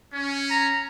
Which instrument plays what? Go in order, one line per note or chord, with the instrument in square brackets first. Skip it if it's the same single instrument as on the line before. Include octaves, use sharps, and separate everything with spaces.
[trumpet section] C#4
[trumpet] A#5